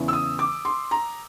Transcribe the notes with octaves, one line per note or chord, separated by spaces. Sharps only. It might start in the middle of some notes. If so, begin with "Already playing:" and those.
Already playing: E2 C#3 E3
E6
D#6
D6
C6
A#5